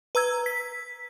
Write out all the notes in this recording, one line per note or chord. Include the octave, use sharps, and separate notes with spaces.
B4 A#5 E6 G#6
B6